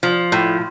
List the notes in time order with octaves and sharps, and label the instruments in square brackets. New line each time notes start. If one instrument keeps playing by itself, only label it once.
[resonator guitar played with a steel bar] F3
A2